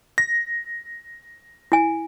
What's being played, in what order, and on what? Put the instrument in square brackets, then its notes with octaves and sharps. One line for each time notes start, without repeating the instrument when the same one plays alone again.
[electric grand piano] A#6
[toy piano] E4 G#5